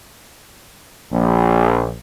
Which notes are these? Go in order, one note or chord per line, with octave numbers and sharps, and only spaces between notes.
A#1